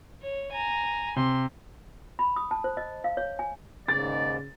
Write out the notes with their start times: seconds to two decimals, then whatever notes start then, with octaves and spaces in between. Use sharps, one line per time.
0.23 C#5
0.52 G#5 A#5
1.16 C3 C6
2.19 B5
2.36 D#6
2.51 A5
2.64 C5
2.77 D#5
3.04 F5
3.17 C#5
3.39 G#5
3.88 D#2 G#2 C#3 D5 A6